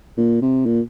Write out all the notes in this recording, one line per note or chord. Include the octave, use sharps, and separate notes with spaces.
A#2
C3
A#2